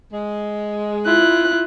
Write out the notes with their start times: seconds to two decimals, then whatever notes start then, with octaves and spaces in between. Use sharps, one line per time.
0.12 G#3
1.06 E4 F4 F#6